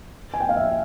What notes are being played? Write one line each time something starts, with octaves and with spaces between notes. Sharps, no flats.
G#5
G5
F5
E5